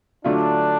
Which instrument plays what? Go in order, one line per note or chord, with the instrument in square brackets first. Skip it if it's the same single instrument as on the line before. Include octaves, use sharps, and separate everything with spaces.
[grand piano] D3 F#3 A3 F4 [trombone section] D4